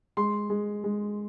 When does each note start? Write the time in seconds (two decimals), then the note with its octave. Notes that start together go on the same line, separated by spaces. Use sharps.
0.17 G#3 C6
0.50 G#3
0.84 G#3